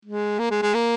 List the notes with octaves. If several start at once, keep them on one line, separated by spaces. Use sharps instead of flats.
G#3
A#3
G#3
G#3
A#3